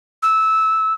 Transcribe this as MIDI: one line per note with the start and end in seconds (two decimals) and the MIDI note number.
0.23 0.94 88